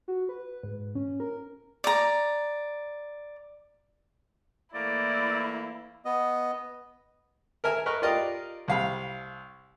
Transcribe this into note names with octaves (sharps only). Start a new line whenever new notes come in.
F#4
B4
G#2
C#4
A#4
D5 A#5
E3 A3 A#3 E4 D5
B3 D#5
A#4 E5 G#5
A#4 B4 D#5 C#6
F4 G4 A#4 D5 D#5
C2 F5 B5